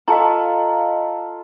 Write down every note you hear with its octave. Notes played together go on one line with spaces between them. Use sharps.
F4 A4 D#5 F5 A5 A#5